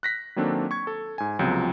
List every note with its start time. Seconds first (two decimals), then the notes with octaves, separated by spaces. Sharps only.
0.03 F#6 A#6 B6
0.36 D#3 F#3 A#3 C4 D4 A4
0.71 C#6 G#6
0.87 A4
1.18 G#2 G#5
1.39 C#2 C3 F3 F#3 B3 C4